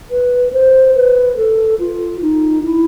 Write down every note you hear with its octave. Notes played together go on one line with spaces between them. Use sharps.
B4
C5
B4
A4
F4
D#4
E4